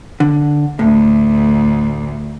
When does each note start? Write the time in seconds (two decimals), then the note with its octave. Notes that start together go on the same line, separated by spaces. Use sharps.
0.20 D3
0.79 D2 A2